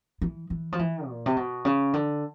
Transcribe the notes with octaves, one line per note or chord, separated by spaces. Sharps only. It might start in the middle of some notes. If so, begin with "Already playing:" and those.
E3
E3
F3
E3
A#2
C3
B2
C#3
D3